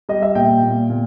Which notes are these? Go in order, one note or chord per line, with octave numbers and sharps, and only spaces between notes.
G3 D#5
E5
A#2 G5
A#2
A#2